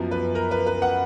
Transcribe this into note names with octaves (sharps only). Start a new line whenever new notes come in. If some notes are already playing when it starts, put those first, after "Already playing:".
Already playing: F#2 F3 B3
B4
A#4
B4
B4
F#5